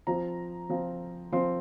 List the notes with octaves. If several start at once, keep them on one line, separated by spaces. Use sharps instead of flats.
F3 C4 F4 A#5
F3 C4 F4
F3 C4 F4 C6